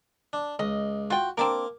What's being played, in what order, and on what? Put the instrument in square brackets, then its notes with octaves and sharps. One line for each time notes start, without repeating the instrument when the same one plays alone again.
[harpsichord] D4
[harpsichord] C#2 [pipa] D#5
[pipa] F4 G5 [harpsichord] F#4
[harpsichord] A#3 D6 [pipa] C4 D4 A#4